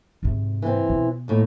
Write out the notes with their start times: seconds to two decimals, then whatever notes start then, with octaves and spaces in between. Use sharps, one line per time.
0.23 G#2 C3
0.62 E3 C4
0.89 B2
1.28 D#2 A2